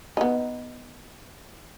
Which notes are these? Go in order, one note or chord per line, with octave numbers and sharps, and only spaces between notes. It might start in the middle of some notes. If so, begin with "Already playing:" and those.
B3 D#4